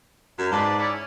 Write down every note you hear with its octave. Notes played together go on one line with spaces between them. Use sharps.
F#2
G#2 B4 D5 A5
C#4 E4 D5
C#4